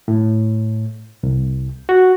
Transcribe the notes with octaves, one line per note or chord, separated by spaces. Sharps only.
A2
C2
F#4